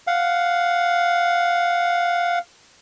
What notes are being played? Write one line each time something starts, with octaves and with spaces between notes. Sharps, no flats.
F5 F#5